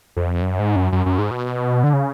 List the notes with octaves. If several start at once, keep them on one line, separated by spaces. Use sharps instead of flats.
F2
F#2
G#2
F#2
F#2
F#2
G#2
B2
D3
C#3